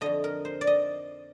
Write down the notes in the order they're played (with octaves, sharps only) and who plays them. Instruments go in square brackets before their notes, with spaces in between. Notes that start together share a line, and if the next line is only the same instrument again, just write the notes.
[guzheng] F2 D3 D#5
A#4
C5
D5
D#5